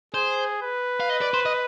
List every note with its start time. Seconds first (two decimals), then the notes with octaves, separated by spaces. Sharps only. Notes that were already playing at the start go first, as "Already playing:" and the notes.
0.14 G#4 C5
0.62 B4
1.00 F5
1.10 D#5
1.22 D5
1.34 C5
1.46 D#5